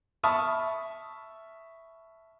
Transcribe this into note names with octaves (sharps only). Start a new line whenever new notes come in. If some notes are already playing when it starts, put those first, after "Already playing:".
E5 A5 B5 C#6 D#6 F6